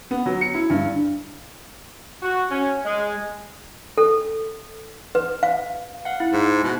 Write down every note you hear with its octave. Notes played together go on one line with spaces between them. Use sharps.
B3
F#3
C#7
E4
G2
F#4
C#4
G#3
A4
B4
F5
F5 F#5
E4
G#2
B2